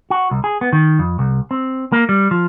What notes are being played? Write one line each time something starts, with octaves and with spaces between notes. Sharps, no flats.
F#4
C2
G#4
B3
D#3
F2
C2
C4
A#3
G3
F3